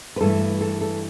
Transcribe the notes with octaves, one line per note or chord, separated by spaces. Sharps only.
B4
G2 E3 A3 A4
A4
A4